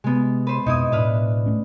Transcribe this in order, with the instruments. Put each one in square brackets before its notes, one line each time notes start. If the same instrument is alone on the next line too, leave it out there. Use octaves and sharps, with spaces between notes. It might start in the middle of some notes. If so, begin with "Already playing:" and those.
[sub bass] C3 [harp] G#3 B3
[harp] B4 C5
[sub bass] F2 [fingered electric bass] B2 [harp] D#4 E4 D#6
[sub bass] A2 [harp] D4 B4 F6
[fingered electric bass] A3 C#4